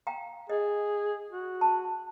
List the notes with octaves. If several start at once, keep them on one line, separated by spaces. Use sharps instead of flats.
F5 G5 A#5
G#4 D#5
F#4
A5